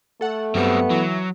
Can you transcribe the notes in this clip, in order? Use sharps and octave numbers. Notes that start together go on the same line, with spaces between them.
A3 A4 F#5
G2 F#3 G3 B3 C4 C#7
E3 F#3